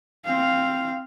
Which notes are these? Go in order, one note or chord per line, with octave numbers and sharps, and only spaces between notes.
C4 F5